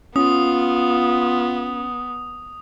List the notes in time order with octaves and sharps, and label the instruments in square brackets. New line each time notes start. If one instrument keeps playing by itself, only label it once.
[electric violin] B3 [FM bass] C#4 [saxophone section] F4 [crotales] D#6